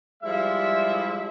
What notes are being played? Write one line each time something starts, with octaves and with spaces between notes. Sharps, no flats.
F3 G3 G#3 E4 E5